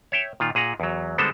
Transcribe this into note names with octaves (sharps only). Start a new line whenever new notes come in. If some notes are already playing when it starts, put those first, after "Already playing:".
C#5 E5 G5
A#2 D#3 F4
A#2 G#4 F#5 A#5
E2 F#3
D3 G3 G#3 B3 A4 C5